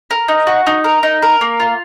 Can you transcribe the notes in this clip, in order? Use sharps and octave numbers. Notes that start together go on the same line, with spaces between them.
A#4
D#4
F#4
D#4
A#4
D#4
A#4
A#3
F4